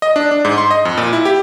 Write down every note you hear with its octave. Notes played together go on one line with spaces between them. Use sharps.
D#5
D4
D4
G#2
C6
D#5
F2
A#2
E4
G4